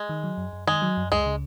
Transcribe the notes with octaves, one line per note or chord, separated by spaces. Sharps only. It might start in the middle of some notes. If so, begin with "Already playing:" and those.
Already playing: G#3
D#3
F#3
F#2
F#2
D#3 G#3
F#3
F#2
C#2 G#3
C#3